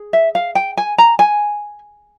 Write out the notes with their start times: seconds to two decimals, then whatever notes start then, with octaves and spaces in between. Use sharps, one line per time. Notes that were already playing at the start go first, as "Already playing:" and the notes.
Already playing: G#4
0.13 E5
0.35 F5
0.55 G5
0.77 G#5
0.98 A#5
1.19 G#5